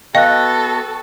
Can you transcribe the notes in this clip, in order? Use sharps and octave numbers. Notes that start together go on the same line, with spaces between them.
B3 F#4 A4 D#5 F5 G5 F#6